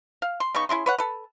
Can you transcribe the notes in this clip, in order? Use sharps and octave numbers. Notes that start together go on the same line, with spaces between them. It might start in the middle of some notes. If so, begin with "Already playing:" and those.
F5
C6
C#3 B3 D#4 C#6
C#4 E4 G#4 C6
B4 C#5 F#5
A4 B4